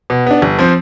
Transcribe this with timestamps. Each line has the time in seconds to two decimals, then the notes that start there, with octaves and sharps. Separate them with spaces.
0.10 B2
0.26 B3 D4
0.42 G1
0.59 F3 C4